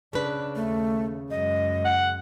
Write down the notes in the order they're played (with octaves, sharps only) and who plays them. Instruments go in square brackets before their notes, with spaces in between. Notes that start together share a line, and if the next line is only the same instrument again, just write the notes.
[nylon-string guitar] C#3 B4 [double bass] D4
[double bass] D#2 [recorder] A3
[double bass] F#2 G#3 [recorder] D#5
[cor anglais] F#5